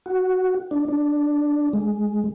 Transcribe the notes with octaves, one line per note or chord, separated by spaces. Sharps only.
F#4
D4
D4
G#3